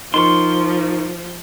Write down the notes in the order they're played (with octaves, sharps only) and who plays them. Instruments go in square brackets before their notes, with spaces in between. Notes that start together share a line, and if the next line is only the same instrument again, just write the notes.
[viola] F3 [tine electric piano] D#4 A#4 C#6 [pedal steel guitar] C6